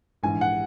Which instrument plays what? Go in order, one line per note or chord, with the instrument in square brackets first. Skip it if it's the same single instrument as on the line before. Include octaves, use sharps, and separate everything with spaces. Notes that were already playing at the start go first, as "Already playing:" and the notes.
[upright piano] A#1 G#2 E3 [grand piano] G#5
[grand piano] F#5